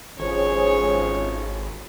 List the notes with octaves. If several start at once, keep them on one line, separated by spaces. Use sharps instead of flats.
G#1 F2 C#4 G#4 C5 C#5